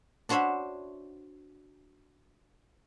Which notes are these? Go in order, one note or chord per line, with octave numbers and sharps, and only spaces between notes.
D4 F#4 C5 C#5 E5 B5